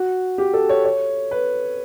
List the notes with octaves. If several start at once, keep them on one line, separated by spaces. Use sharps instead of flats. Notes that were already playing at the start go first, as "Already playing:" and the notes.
Already playing: F#4
G4
A4
C#5
C#5
B4